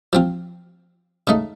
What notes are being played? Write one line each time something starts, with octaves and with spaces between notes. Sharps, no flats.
F3 C4 F4
C#3 A3 D#4